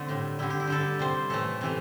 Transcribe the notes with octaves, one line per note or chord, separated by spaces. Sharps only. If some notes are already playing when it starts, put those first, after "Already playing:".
Already playing: D3 A3 C4
A2 G3
D3 G3 E4
G4
E4
D3 G3 A4
C3 G3 C5
A2 E3 A3 A4
C3 E3 A3